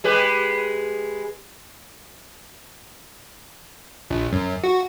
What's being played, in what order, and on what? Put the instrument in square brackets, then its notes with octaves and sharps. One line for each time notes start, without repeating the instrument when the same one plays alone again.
[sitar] G#3 G4 B4
[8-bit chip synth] A#1
F#2
F#4